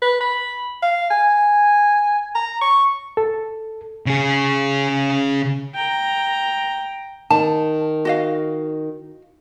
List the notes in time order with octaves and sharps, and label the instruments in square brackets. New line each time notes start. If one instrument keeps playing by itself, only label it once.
[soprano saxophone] B4
B5
F5
G#5
A#5
C#6
[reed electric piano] A4
[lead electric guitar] C#3 G#4
[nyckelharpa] G5 A#5
[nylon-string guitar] D#3 [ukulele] A5
[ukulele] F#4 D#5 F5